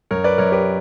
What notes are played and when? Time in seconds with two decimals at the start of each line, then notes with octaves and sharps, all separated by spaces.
0.11 F#2 A#4 C#5
0.24 B4 D5
0.38 F#2 A#4 C#5
0.52 G4 B4